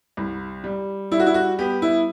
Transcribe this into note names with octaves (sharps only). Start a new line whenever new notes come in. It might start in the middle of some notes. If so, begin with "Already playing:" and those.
C2
G3
G3 E4
F#4
E4
F#4
B3 G4
E4